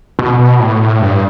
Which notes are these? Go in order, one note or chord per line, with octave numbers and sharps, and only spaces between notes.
B2
B2
A2
G2